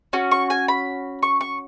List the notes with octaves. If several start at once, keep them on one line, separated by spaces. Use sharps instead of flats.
C#4 F#4
C#6
G#5
B5
C#6
C#6